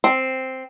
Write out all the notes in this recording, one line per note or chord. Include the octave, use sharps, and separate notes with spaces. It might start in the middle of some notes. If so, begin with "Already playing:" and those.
C4